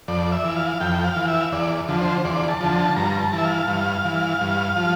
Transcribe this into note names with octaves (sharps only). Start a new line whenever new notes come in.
F2 D5
E5
E3
F5
F2 G5
F5
E3
E5
E2 D5
D3 F3
C5
E2 D5
A5
D3 F3
A5
G2 A#5
A5
E3
E5
F5
G2
E3
G2
F3